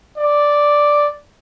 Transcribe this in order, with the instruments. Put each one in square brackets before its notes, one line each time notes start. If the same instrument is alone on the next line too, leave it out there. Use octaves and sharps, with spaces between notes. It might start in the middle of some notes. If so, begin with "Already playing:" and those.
[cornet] D5